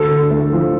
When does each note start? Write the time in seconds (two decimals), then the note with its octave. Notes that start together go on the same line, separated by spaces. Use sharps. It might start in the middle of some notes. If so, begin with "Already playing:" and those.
Already playing: D2 A4
0.11 D3
0.31 A3
0.53 F3